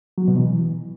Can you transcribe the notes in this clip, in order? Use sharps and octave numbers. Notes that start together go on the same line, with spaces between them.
F#3
B2
E3